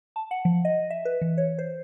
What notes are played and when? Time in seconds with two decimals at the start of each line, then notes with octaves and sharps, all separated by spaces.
0.16 A5
0.31 F#5
0.45 F3
0.65 D#5
0.90 E5
1.05 B4
1.22 E3
1.38 C#5
1.59 C5